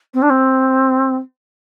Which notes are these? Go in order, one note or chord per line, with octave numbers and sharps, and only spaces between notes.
C4
D4
C4